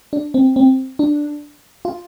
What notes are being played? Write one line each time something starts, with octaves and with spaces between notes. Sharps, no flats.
D4
C4
C4
D4
F4